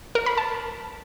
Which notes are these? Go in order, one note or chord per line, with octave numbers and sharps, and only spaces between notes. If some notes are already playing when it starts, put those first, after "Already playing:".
A#4
B5
A5